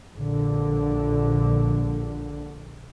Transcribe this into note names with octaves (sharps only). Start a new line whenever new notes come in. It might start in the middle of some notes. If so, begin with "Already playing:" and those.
A#1 D3